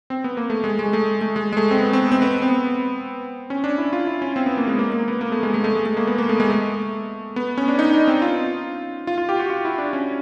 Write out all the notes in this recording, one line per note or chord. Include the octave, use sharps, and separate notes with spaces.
C4
B3
A#3
A3
G#3
G#3
A3
A3
G#3
G#3
A3
C4
B3
C4
C4
B3
C4
C#4
D4
E4
F4
E4
C#4
C4
B3
A#3
G#3
A#3
A#3
B3
A#3
A3
G#3
A3
A3
G#3
A3
A#3
B3
A#3
A3
G#3
A3
B3
C#4
D4
D#4
D4
C4
F4
F4
F4
G4
F#4
F4
E4
D4
C#4